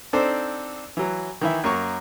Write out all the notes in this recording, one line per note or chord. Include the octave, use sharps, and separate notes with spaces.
C4 D4 D#4 A4 C5 D5
E3 F#3
D#3 E3 E4
F#2 A#3 C#5 C#6